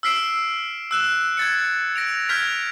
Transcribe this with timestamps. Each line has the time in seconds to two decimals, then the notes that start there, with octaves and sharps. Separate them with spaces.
0.03 E6 F6 B6 C7 D7 E7
0.91 E6 F#6 E7
1.37 G#6 A6 C#7
1.96 A#6 D7 F7
2.29 F6 G6 G#6 B6 F7